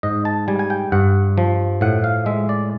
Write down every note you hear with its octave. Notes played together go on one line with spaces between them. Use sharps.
G#2 D#5
A5
G3 G#5
G#5
G5
G2 F#5
F3
A2 F#5
F5
G#3 E5
D5